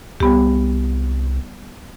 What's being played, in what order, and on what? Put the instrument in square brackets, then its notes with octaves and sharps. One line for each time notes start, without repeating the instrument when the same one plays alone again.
[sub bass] C2 [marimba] G3 B3 G4